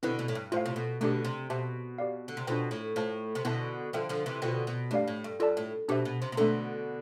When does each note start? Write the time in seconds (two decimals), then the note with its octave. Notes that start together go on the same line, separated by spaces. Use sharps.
0.03 B2 D3 C4 E4 B4
0.19 B2
0.28 A2
0.35 G2
0.52 A2 F4 C5 F5
0.66 C3
0.76 B2
1.01 B2 D3 A3 D4 G4
1.25 C3
1.50 B2 G4 C5 E5 A5
1.98 G4 D5 F5
2.28 D3
2.37 C3
2.47 B2 D4 F4 A4 C5 G5
2.71 A2
2.96 A2 F4 C5 F5 A5
3.35 C3
3.45 B2 D3 B3 E4 B4 E5 A5
3.93 D3 F3 F4 A4 E5 G5
4.09 D3 F3
4.26 C3 E3
4.42 B2 D3 F4 C5 G5
4.67 B2
4.91 G2 A3 D4 G4 D5 F5
5.08 A2
5.24 G2
5.40 G2 F4 A4 D5 A5
5.57 A2
5.88 B2 D4 G4 C5 E5
6.05 B2
6.22 C3
6.32 C3
6.37 B2 D3 A3 D4 A4